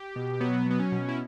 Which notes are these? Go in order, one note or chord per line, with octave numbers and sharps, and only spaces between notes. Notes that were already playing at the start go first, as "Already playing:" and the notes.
Already playing: G4
B2
F#3 B3
F#3 B3
C#4
B2
E4